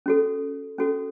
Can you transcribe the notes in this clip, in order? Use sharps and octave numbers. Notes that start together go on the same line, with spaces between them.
C#4 F#4 A4
C#4 F#4 A4